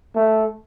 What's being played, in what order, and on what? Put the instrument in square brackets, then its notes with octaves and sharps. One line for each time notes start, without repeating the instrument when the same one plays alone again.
[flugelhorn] A3